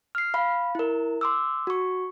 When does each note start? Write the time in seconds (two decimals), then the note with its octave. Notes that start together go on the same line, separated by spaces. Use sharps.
0.15 F6 C7
0.34 F5 B5
0.75 E4 A#4
1.21 C6 D6 E6
1.67 F#4 C#6